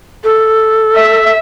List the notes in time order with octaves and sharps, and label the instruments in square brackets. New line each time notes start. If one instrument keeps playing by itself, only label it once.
[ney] A4
[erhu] E5